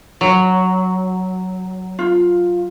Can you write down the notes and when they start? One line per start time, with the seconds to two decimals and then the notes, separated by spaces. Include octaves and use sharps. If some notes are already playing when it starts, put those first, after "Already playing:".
0.21 F#3
1.99 F4